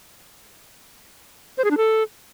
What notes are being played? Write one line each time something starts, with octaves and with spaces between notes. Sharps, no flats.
C5
G#4
D4
A4